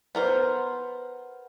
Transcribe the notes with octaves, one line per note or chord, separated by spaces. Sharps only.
B3 A#4 C5